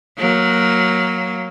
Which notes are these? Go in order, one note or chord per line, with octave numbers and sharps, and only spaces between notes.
F#3 A#3